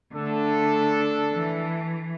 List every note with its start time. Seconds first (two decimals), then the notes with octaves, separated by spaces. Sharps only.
0.14 D3 A3 D4 A4
1.33 E3